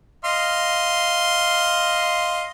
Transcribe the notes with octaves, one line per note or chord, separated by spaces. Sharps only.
D#5 F5 C6